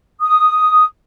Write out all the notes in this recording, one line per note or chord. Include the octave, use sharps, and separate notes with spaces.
D#6